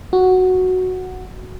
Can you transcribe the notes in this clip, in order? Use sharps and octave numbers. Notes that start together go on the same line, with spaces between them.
F#4